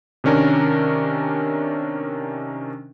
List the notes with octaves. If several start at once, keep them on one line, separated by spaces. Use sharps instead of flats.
C3 D#3 C#4 D4 A#4